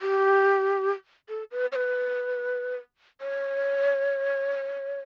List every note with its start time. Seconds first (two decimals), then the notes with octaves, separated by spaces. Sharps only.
0.02 G4
1.29 A4
1.51 B4
1.72 C#5
1.76 B4
3.21 C#5